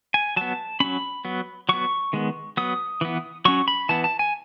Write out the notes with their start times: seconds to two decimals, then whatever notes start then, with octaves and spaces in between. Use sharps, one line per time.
0.14 G#5
0.36 F#3 B3 A5
0.80 F#3 C#4 B5
1.25 F#3 B3
1.69 F#3 B3 C#6
2.13 D#3 G#3 B3
2.57 F#3 B3 D#6
3.01 E3 B3
3.45 F#3 C#4 C#6
3.68 B5
3.89 E3 B3 A5
4.04 A5
4.19 G#5